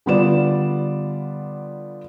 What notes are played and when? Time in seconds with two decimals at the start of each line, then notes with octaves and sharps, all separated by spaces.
0.06 D3 G3 B3 F4 D5 E7